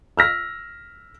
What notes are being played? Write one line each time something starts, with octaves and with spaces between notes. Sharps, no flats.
E6 F6 A#6 B6